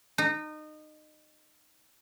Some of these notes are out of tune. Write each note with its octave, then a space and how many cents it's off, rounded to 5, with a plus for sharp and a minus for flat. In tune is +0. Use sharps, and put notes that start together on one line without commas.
D#4 -25